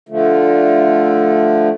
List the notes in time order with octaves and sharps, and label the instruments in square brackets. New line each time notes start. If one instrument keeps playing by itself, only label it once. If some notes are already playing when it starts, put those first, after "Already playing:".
[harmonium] D3 F3 A3